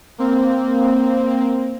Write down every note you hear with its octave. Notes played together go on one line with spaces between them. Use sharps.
A#3 C4